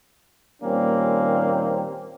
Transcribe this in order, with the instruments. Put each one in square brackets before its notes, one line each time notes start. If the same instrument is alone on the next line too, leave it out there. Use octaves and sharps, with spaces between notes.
[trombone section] A#2 D#3 G3 A#3 C4 C#4